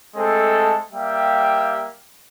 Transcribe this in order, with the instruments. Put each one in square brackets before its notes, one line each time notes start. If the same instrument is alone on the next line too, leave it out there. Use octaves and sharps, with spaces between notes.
[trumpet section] G#3 A3 C4 A4
G3 A#3 G4 E5 F5 G5